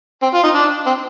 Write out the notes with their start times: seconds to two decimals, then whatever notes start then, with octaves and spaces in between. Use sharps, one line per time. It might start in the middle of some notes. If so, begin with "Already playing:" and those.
0.22 C4
0.34 F4
0.44 D#4
0.54 D4
0.87 C4